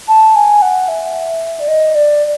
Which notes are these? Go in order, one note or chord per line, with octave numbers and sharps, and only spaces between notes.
A5
G#5
F#5
E5
D5
D#5
D5